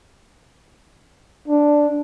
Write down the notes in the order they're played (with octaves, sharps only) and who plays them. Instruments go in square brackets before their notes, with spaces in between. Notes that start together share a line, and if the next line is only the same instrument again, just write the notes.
[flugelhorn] D4